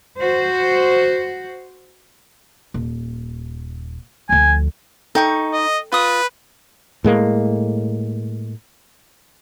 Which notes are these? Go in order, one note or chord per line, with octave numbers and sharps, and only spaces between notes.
F#4 C5
D#1
D2 F3 G#5
D#4 A4 G5 C#6
D#5
F4 B4 D#6
A2 G#3 A#3